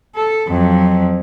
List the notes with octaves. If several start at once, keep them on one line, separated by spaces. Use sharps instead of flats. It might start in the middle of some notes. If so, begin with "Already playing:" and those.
A4
F2 F#3